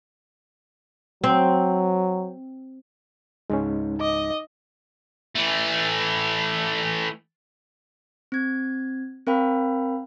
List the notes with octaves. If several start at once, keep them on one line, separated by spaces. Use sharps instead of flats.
F#3 C4
C#2 G#2 G#3 C#4 D#4
D#5 D6
E3 A3
C4 G#6
C4 A#4 F5 G5 B5